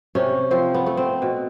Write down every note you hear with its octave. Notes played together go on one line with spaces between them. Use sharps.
C3 C#4
F3 C4
B3
A3
C4
B2